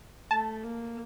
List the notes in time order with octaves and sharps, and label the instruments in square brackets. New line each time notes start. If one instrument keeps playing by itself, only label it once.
[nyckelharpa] A3 [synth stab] A5
[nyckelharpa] A#3